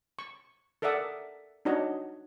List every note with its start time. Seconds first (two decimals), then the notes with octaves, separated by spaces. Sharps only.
0.19 C#6
0.82 A4 A#4 D5 E5 F#5 D#6
1.65 D4 D#4 F#4 C#5 D#5